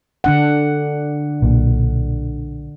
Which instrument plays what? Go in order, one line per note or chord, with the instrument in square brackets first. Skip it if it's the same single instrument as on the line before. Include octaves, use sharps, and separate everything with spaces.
[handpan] D3 D4 F#5
[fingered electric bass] B1 A#2